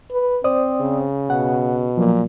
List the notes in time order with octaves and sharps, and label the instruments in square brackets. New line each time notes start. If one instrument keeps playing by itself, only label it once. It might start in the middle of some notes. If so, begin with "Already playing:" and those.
[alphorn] B4
[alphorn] C4 [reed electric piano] C5 D5 D#6
[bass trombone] C#3
[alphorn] B2 [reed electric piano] F#5
[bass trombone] A#2 [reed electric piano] F3 F#3 A#3